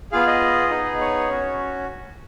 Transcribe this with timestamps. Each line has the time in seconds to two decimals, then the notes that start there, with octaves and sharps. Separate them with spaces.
0.12 B3 F4 G#4 F5
0.27 D#5
0.71 B3 D#4 G#4
1.00 C#5
1.29 C#4 F#4